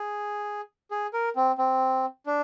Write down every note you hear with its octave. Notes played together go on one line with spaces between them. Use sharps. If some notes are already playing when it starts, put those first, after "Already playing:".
Already playing: G#4
G#4
A#4
C4
C4
D4